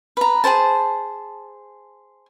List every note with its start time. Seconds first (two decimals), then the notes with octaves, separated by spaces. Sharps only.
0.17 B4 A#5
0.44 G#4 A#4 C5 A5